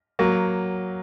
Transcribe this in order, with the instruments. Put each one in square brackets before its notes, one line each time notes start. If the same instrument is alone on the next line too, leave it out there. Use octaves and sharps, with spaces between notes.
[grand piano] F#3 A#3